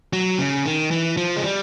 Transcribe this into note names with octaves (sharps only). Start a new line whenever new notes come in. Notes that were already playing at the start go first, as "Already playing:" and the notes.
F#3
C#3
D#3
E3
F3
G#3
G3